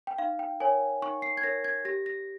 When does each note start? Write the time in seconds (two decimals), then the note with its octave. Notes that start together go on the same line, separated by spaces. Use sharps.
0.07 G5
0.18 D#4 F5
0.39 G5
0.60 A#4 C#5 G#5
1.02 D#4 C#6
1.22 C7
1.37 G#6
1.43 A#4 C#5 A#6
1.64 G#6
1.85 G4 A#6
2.06 A#6